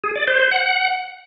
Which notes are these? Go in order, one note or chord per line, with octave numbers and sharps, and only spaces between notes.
G#4
D5
C5
C5
F#5